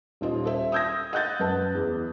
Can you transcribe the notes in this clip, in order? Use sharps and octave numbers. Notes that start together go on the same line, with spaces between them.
D#1 D#2 F4 D#5
A4 C5 E5
D#6 E6 G6 G#6 A#6
D#5 F#5 F#6 G6 A6
F#2 B4 A5
E2